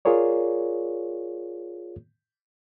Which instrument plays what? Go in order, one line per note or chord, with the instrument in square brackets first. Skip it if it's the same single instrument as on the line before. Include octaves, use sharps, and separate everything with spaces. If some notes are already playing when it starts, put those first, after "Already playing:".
[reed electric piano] F4 G#4 A#4 C#5 D5